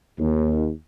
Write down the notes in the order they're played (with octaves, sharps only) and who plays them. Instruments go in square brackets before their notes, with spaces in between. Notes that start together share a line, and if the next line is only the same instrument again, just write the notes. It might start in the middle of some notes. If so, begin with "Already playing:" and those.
[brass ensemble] D#2